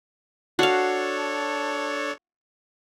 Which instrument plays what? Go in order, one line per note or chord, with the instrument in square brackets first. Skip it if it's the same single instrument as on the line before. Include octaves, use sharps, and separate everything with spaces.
[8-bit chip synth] D4 A4 C#5 [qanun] F#4 F5